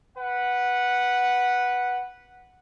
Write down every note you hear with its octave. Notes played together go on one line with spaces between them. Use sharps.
B4 F#5